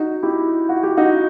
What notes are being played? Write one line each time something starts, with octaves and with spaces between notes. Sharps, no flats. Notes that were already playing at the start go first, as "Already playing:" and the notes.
Already playing: D#4 F#4
E4 G4
F#4
G4
D#4 F#4